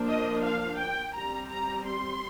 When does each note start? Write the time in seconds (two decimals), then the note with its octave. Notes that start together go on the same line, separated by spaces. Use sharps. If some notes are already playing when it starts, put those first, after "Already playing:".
Already playing: F3 A#3 D4
0.09 D#5
0.44 F5
0.79 G5
1.15 G3 C4 A#5
1.50 A#5
1.86 C6